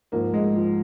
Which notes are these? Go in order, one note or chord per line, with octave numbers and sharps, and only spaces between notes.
G#2 F3 A#3
G#3
F3